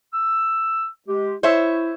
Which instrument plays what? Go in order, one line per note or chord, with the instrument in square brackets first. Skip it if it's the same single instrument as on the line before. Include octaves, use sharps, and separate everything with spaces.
[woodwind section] E6
G#3 G4
[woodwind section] E4 [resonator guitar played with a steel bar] C5 C#5 E5